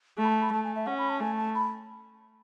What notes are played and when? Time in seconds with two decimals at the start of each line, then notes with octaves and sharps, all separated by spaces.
0.18 A3
0.24 B5
0.30 A5
0.41 B5
0.52 A3 A5
0.64 G#5
0.76 E5
0.86 C#4 F#5
0.98 B5
1.10 A5
1.20 A3 G#5
1.38 A5
1.55 B5